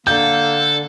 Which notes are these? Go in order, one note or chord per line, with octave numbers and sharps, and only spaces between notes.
D3 A#3 A4 G6